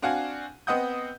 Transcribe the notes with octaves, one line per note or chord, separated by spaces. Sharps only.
C4 D4 F#4 F5 F#5 G#5
B3 C4 D#5 F#5 D#6 G6